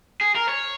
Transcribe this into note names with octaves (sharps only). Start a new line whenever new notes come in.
G#4
A#4
C#5